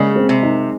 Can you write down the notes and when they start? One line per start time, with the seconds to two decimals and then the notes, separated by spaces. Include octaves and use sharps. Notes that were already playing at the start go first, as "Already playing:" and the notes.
Already playing: C#3 G#3 A#3
0.16 C4
0.29 C3
0.43 D#4